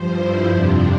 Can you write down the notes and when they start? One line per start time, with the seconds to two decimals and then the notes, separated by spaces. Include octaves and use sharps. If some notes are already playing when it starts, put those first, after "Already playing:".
Already playing: G2 F3 C5
0.16 E4
0.47 F2 C3 F3 D4